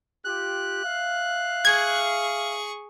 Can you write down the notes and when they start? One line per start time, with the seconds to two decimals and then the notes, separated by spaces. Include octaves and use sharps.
0.25 F4 G4 F#6
0.83 E5 F5
1.65 G#4 C#6 G#6